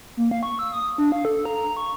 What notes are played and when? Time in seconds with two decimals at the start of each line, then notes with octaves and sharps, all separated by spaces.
0.17 A#3
0.31 F5
0.43 C#6
0.59 E6
0.72 D#6
0.98 D4
1.12 F5
1.25 A4
1.45 A#5
1.77 C#6